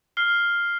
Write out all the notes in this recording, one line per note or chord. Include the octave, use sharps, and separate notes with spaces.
F6 C7 G7